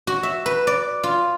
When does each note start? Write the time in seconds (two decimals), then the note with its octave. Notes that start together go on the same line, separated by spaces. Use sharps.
0.07 F#4
0.23 E5
0.46 B4
0.67 D5
1.03 F4